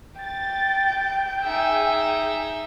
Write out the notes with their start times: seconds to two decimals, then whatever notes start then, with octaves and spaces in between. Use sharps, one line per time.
0.21 G5 A6
1.44 D#4 G#4 E5